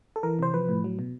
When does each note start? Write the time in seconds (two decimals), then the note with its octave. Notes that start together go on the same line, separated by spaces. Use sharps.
0.16 A4
0.23 E3 A#4
0.39 C3 C5
0.54 F3 B4
0.69 A2
0.84 F#3
0.99 B2